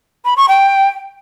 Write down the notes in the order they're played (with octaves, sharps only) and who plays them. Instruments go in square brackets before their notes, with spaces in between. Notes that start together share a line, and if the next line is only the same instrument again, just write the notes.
[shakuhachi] B5
C#6
G5